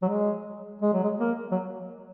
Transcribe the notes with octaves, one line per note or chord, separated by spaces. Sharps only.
F#3
G#3
G#3
F#3
G#3
A#3
F#3